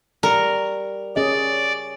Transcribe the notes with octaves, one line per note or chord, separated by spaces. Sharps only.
G3 A#4 A5 C#6
C#4 G#4 D5 D#5